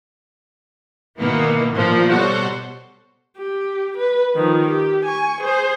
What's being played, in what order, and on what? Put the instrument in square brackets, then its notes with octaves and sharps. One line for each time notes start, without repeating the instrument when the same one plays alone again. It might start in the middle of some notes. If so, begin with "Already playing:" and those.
[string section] B2 D#3 E3 A#3 B3
A#2 F3 A#3
B2 G3 F#4 A4 C5 C#5
[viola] G4
B4
D#3 F3
G4
G#5 C#6
G#4 C5